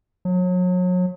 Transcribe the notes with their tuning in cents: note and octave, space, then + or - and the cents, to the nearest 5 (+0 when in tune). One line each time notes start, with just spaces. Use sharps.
F#3 -35